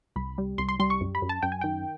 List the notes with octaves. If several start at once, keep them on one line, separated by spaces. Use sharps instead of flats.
C2 B5
G3
C2 C6
C6
G3 C6
C#6
F#2
B5
F#2
A5
F#2 G5
G#5
D#3 G5